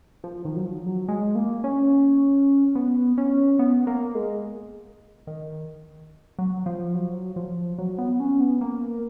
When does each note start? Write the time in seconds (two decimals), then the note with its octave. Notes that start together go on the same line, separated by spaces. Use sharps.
0.24 F3
0.45 D#3
0.56 F#3
0.65 F3
0.86 F#3
1.08 G#3
1.35 A#3
1.64 C#4
2.75 B3
3.18 C#4
3.59 B3
3.87 A#3
4.15 G#3
5.27 D#3
6.39 F#3
6.66 F3
6.94 F#3
7.36 F3
7.78 F#3
7.98 B3
8.20 C#4
8.40 B3
8.61 A#3